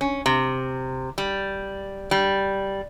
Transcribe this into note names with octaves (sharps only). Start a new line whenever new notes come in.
C#4
C3
G3
G3